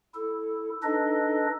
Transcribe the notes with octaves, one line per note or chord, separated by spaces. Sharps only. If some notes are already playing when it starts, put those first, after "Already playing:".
E4 A4
D4 D#4 A4 B4 D#5